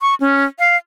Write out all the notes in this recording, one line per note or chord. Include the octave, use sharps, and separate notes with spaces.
C#6
C#4
F5